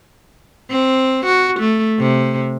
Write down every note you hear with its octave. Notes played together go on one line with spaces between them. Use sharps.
C4
F#4
A3
C3